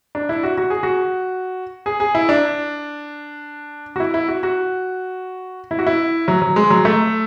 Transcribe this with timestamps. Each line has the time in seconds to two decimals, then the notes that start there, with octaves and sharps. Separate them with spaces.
0.15 D4
0.29 E4
0.43 F#4
0.58 F#4
0.70 G#4
0.83 F#4
1.86 G#4
2.00 G#4
2.15 E4
2.29 D4
3.96 F#4
4.00 E4
4.14 E4
4.28 F#4
4.43 F#4
5.71 E4
5.79 F#4
5.87 E4
6.28 F#3
6.42 F#3
6.56 G#3
6.70 F#3
6.85 A3